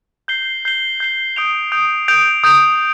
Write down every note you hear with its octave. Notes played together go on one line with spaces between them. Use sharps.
G6 C7 G7
G6 C7 G7
G6 C7 G7
D#6 G6 D7 F7
D#6 G6 D7 F7
D#6 G6 D7 F7
D#6 G6 D7 F7